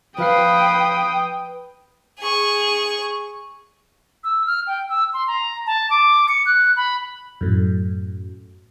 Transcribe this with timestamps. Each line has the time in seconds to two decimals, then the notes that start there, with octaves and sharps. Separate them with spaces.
0.18 F3 B4 F5 G5 D#6 C7
2.19 G#4 C#6
4.24 E6
4.46 F6
4.67 G5
4.89 E6
5.13 C6
5.27 A#5
5.66 A5
5.90 D6
6.28 C#7
6.46 F#6
6.76 B5
7.41 F#2 A2